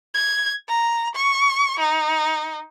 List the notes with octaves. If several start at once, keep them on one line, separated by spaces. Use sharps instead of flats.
G#6
A#5
C#6
D#4